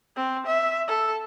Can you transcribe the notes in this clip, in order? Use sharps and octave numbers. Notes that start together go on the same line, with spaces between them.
C4
E5
A4